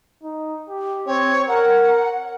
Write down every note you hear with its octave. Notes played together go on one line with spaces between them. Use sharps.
D#4
G4
C4 C#5
A#4 F#5